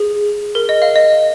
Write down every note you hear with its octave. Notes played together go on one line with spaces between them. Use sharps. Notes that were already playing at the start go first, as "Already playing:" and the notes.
Already playing: G#4
A#4
D#5
F5
D#5